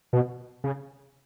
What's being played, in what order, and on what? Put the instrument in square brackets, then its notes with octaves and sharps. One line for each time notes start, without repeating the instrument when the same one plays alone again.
[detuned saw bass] B2
C#3